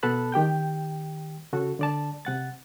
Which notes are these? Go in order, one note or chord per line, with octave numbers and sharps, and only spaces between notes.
B2 B3 A4 A5 B5 F#6
D#3 G4 G5 G6
C#3 F#4 A4
D3 D5 A5
C3 F#5 A6